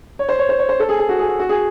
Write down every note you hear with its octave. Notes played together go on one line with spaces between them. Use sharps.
C#5
C5
C#5
C5
C#5
C5
A4
G#4
G#4
F#4
G#4
F#4
F#4
G#4